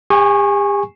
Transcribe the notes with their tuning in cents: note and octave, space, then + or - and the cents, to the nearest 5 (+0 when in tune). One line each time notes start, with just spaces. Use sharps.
G4 +40 G#5 -10 C#6 -15